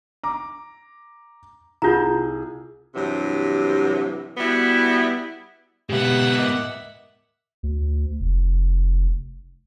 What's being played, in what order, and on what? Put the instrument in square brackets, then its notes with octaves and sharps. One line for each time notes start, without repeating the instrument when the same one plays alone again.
[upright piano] A#5 D6
[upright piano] C2 G#4 G6 [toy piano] D#4 F4 A#5
[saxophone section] G2 C3 E3 F#3
G3 B3 E4 F#4
[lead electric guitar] G#2 B3 [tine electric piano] B2 G4 [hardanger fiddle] E5 F#5
[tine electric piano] A#4 D#5 D6
[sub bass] D2
F1